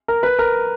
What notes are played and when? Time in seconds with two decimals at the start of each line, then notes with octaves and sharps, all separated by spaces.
0.08 A#4
0.23 B4
0.39 A#4